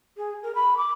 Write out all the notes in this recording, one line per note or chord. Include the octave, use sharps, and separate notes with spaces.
G#4
A#4
B5
D6